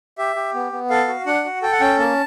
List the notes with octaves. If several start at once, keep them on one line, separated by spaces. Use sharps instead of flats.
G4 E5
G4
B3
B3
A4 F5
F#4
D4 F#5
F#4
A4 G5
F#5
C#4 G5
A#3 A5